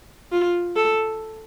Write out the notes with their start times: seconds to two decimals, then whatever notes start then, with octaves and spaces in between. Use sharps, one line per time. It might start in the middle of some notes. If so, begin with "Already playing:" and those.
0.32 F4
0.76 A4